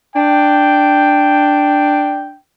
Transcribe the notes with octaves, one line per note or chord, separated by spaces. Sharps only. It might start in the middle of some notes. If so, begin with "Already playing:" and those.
D4 G5